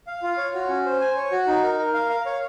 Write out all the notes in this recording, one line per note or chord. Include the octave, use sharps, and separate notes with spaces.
F5
F4
C#5
F#4
C#4
C5
G#5
C#5
F#4
D#4
A#4
A#4
F5
F5
C#5